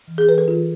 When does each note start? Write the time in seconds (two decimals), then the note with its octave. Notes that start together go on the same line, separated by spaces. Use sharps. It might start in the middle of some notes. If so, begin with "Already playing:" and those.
0.08 E3
0.18 G#4
0.28 E3 B4
0.38 A4
0.48 E3 F4